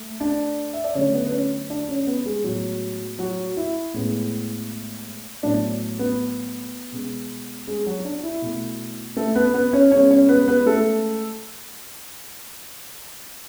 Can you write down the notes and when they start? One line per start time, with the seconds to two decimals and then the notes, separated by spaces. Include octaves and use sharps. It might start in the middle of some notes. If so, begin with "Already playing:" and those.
Already playing: A3
0.20 D4 D5
0.73 E5
0.84 D5
0.95 D3 F#3 A3 C#4 C#5
1.14 B3 B4
1.26 B4
1.32 C#4 C#5
1.70 D4 D5
1.89 C#4 C#5
2.07 B3 B4
2.26 G#3 G#4
2.44 A2 F#3 G#3 B3 F#4
3.19 F#3 F#4
3.57 E4
3.94 A2 G#3 B3
5.43 A2 F#3 B3 D4
5.99 B3 B4
6.92 B2 G#3 B3
7.67 G#3 G#4
7.86 F#3 F#4
8.05 D4
8.23 E4
8.42 B2 A3
9.17 A3 A4
9.36 B3 B4
9.54 B3 B4
9.73 C#4 C#5
9.91 C#3 G#3 B3 C#4 C#5
10.10 C#4 C#5
10.29 B3 B4
10.48 B3 B4
10.66 A3 A4